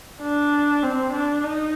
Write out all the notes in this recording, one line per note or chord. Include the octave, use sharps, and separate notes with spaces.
D4
C4
D4
D#4